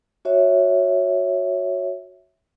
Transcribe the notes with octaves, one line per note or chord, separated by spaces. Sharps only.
F#4 C#5 E5